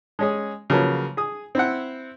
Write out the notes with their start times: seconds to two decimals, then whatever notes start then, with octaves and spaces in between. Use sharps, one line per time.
0.19 G#3 C#4 G#4
0.70 C#3 F3 F#3 A#3 B4
1.17 G#4 D#6
1.55 C4 E4 F#5